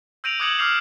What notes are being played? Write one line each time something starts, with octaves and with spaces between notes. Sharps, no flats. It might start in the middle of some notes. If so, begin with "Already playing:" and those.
E6 G6 A#6 D7 D#7 F7
D6 D#6 F#6 G#6 C#7 F#7
D6 E6 F6 G6 C7 F7